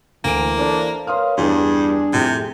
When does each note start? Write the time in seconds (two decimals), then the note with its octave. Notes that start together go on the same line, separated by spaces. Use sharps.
0.24 D2 E3 A#3 D7
0.58 D4 A4 C5
1.07 A#4 B4 C#5 F5 C6 D#6 F6
1.38 E2 G2 G3 D4 G#4
2.13 F2 A2 C3